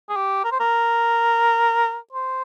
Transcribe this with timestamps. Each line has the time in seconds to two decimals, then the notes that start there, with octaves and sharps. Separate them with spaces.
0.09 G#4
0.16 G4
0.44 A#4
0.51 C5
0.60 A#4
2.13 C5